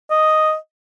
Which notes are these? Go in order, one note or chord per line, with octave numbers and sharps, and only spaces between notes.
D#5